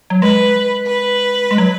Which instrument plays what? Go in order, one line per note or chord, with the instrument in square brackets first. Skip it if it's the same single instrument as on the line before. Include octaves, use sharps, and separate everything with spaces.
[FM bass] F#3
[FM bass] G#3 [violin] B4
[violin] B4
[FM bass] G#3
F#3